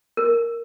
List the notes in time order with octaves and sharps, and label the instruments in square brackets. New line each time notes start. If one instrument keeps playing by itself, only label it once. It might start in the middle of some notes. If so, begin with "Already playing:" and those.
[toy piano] A#4